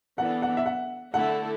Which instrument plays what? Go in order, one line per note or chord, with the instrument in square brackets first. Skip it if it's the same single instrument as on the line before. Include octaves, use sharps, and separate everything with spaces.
[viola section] E3 B3 D4 A4 [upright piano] F#5
[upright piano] F#5
E5
F#5
[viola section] D3 A3 E4 A4 [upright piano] F#5